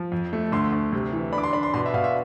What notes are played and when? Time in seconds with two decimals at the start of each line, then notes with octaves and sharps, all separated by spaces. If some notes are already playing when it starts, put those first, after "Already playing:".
Already playing: F3
0.12 F2
0.33 A3
0.52 D2 C6
0.73 D2
0.93 C3
1.13 E3
1.33 D4 B5
1.38 D6
1.43 C6
1.53 D4 B5
1.63 C6
1.74 B2 C6
1.86 E5
1.94 B2 F5
2.04 E5